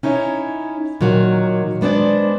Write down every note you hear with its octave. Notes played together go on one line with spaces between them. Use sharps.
C#4 D#4 E4 C#5
A#2 D#3 F#3
G#3 B3 D4 C5 D5